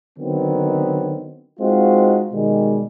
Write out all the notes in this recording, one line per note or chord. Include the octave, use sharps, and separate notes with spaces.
D3 D#3 F#3 B3 C4
G#3 C4 D#4 F4 F#4
B2 D#3 G3 G#3